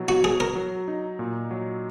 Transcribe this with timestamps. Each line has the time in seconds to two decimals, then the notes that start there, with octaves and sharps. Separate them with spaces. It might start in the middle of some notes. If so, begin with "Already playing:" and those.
Already playing: B2 F#3 E4
0.08 F#4
0.24 F#3 G#4
0.40 A#4
0.55 F#3
0.88 D#4
1.19 A#2
1.51 F#3